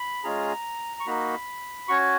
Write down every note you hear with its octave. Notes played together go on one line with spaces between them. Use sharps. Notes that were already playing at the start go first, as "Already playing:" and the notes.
Already playing: B5
G#3 C#4 F4 G#4 A#5
C#6
A#3 D#4 F#4 B5
C#4 F#4 C#6